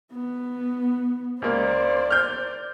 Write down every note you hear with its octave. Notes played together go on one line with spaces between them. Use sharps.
B3
C#2 A#3 C5 D5
F6 G6